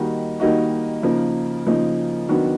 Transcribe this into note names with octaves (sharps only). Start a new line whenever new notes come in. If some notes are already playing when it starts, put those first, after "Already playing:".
Already playing: D#3 G3 A#3 D#4 F#4
D#3 G3 A#3 D#4 F#4
C#3 F3 A#3 D#4
C#3 F3 A#3 D#4
D#3 F#3 B3 D4 F#4